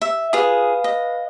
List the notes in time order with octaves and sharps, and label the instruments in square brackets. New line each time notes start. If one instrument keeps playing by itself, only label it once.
[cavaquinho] E5
[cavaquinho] F4 G#4 [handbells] B4 F5 D#6
[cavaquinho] D#5